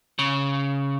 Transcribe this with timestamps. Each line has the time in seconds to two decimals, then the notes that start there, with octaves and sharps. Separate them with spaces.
0.19 C#3